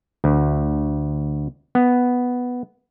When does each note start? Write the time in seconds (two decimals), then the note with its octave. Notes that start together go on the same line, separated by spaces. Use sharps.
0.24 D2
1.75 B3